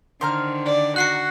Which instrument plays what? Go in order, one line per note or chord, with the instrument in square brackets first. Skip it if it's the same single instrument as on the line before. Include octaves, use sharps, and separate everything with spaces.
[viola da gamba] D3 D#3 [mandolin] C5 A#5 F6
[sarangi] D5
[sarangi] F#4 [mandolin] F#5 A#5 [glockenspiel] F#6 C7 C#7